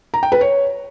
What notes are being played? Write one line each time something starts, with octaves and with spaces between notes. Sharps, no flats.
A#5
G5
B4
C#5